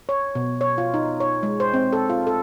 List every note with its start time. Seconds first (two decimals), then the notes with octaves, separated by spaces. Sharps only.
0.09 C#5
0.35 B2
0.61 C#5
0.78 F4
0.94 D#4
1.20 C#5
1.43 G#3
1.60 C5
1.74 C4
1.93 A4
2.10 F4
2.27 A4